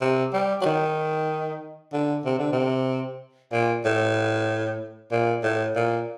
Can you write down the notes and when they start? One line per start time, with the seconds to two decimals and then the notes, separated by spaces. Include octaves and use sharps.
0.01 C3
0.33 G3
0.61 F#3
0.65 D#3
1.93 D3
2.25 C3
2.38 D3
2.52 C3
3.52 A#2
3.85 A2
5.11 A#2
5.43 A2
5.75 A#2